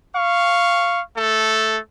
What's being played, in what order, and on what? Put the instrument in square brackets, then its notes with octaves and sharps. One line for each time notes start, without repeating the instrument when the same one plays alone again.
[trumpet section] F5 C#6
A3 A4